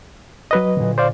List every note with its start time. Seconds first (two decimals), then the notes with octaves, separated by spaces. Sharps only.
0.51 F#3 B4 D#5
0.77 A#2 D3
0.98 C5 D5 F5